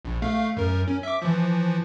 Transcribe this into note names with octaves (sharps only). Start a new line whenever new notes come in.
A#1
A3 F5
F#2 A#4
C#4
E5 D6
E3 F3